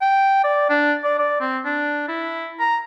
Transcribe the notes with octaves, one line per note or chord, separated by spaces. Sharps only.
G5
D5
D4
D5
D5
C4
D4
E4
A#5